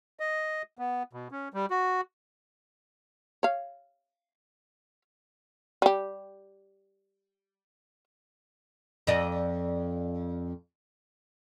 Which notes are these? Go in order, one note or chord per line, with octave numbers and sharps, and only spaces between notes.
D#5
B3
B2
C#4
G3
F#4
C#5 F5
G3 G4
F2 D5 D#5